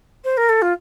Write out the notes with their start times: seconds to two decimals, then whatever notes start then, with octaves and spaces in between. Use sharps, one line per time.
0.24 C5
0.37 A#4
0.49 A4
0.62 F4